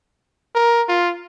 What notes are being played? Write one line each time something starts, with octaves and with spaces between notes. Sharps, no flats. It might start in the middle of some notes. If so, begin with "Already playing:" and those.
A#4
F4